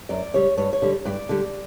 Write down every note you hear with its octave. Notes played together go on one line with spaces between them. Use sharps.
F#2 D5
C#3 G3 C#5
G2 C#5
C#5
D3 G3
G2 D5
D3 G3